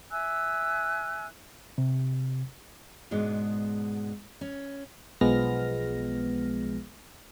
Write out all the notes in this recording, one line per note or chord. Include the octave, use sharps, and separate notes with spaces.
E5 G#5 E6 F#6
C3
G#2 B2 G#3 B3 D4
C#4
B1 F3 G#3 B3 F6 A#6